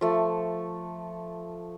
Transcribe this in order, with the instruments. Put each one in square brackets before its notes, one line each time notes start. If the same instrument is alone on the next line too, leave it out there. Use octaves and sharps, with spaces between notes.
[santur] F3 A3